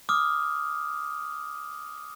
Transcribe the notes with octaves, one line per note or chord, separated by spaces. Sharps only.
D6 D#6 F6